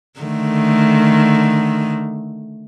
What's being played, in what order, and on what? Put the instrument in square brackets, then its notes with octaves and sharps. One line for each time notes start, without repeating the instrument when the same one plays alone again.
[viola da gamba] D3 D#3 A3